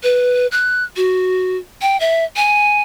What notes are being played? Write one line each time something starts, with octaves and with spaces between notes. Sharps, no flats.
B4
F#6
F#4
G5
E5
G#5